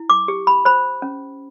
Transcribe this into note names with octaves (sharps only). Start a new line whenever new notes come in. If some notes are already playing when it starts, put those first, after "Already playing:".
Already playing: E4
D6
G4
B5
C5 B5
C#4